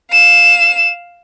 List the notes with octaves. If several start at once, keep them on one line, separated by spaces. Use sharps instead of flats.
F5 E7